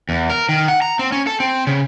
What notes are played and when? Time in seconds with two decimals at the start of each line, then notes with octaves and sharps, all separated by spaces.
0.09 E2
0.30 A#4
0.49 D#3
0.68 F#5
0.82 A#5
0.99 C4
1.12 C#4
1.27 A4
1.40 C4
1.67 C#3